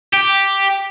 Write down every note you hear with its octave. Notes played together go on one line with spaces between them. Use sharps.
G4